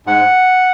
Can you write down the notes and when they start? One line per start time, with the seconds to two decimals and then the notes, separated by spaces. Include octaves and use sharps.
0.06 G#2 F#5